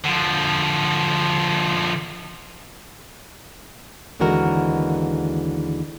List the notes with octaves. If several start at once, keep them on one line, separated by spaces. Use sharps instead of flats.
D3 F3
D#2 D3 E3 G#3 F#4 A#4